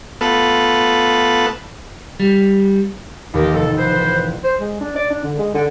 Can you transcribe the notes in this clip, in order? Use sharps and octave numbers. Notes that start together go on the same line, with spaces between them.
A3 B3 F4 A4 B4
G3
A1 D#2 G4 A#4
F1 A4
B4 C5
C5
G#3
D4
D5
D4
D3
G#3
D3